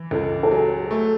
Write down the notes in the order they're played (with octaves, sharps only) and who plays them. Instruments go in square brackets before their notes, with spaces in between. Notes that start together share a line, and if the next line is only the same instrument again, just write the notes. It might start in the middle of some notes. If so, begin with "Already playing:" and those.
Already playing: [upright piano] E3
[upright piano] C#2 [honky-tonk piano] A4
[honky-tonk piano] A4
[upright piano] F#3 [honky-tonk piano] G#4
[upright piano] A3